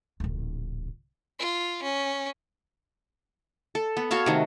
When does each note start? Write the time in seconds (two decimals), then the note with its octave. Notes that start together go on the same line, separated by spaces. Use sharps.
0.20 D1 A#1
1.39 F4
1.83 C#4
3.75 A4
3.97 B3
4.11 F#4 A4 C#5 F5
4.26 C3 D#3 A3